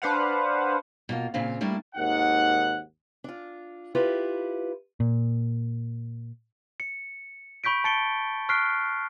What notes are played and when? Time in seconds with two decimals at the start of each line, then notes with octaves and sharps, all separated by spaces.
0.02 D4 B4 C5 F5 F#5
1.09 B2 A#3 F4
1.34 A#2 C#3 C4 F5
1.61 G3 A3 A#3 D4 E4
1.95 G#1 D#2 D#4 F#5
3.24 D4 F4
3.95 E4 F4 G4 B4
5.00 A#2
6.80 C#7
7.64 B5 C#6 G6 B6 D7
7.84 A5 A6 C#7 D7 G7
8.49 C#6 F6 F#6 B6 C7 D7